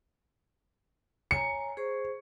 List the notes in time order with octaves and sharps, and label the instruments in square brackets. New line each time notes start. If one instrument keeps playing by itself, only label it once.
[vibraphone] C#5 G#5 A#5 [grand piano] C#7
[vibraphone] G#4 C5 C#6